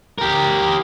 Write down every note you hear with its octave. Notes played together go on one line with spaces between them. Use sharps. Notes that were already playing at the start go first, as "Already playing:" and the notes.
G4 A#4